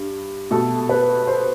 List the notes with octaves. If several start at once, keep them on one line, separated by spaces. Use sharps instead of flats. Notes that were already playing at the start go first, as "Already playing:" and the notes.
Already playing: G2
B2 A3 A4
B4
C5